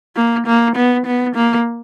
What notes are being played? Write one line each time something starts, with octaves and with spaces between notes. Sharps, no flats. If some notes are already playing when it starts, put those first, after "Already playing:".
A#3
A#3
B3
B3
A#3